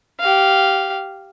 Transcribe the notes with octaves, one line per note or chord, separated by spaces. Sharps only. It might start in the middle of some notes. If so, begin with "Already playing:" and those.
G4 F5